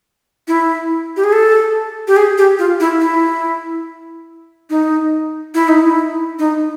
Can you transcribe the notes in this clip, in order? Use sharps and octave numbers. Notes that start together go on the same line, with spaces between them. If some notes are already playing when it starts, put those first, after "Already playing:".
E4
G4
G#4
A4
G4
G#4
G4
F4
E4
E4
D#4
E4
D#4
E4
D#4